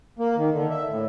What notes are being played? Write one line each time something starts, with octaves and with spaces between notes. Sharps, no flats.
A#3
D#3
D3
E5
A2